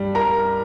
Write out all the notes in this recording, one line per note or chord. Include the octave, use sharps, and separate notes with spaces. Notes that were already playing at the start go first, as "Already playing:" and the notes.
Already playing: G2 G3
A#4 A#5